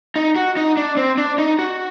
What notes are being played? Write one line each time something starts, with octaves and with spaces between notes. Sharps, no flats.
D#4
F#4
D#4
D4
C4
D4
D#4
F#4